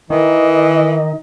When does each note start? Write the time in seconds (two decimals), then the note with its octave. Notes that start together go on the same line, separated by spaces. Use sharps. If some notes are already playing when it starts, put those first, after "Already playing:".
0.10 D#3 E3 D#5